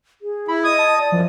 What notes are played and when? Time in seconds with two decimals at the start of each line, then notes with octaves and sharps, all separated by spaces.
0.22 G#4
0.48 E4 B5
0.64 D#5 D#6 G#6
0.79 A5
0.98 D5
1.12 F#2 F3